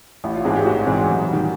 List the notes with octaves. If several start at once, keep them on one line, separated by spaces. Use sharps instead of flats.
A1 E4
F4
G#2 E3 G#3 C4 G#4
G4
A1 F#4
G#2 E3 G#3 C4
F#2
D#3 G3